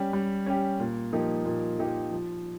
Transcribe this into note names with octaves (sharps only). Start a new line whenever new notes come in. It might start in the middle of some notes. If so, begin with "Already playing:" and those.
Already playing: G3 C#4 G4
G3
C#4 G4
A#2
F3 A#3 D#4 G4
A#2
F3 A#3 D#4 G4
F3